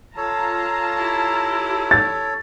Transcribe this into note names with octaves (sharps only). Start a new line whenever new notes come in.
F4 A4 C#5 A5 A#5
E4 G4
A6